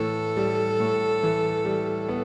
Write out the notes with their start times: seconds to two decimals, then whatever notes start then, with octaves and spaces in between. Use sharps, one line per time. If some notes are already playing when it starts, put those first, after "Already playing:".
Already playing: A2 E3 A4
0.37 G3
0.80 A2
1.23 E3
1.65 G3
2.08 B3